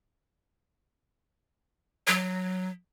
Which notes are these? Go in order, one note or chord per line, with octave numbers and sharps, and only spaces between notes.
F#3